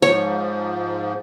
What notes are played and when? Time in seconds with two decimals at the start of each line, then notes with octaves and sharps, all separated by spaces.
0.02 G#2 F3 C#5